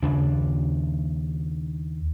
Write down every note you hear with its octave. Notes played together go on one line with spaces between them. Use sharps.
D#2 C#3 D4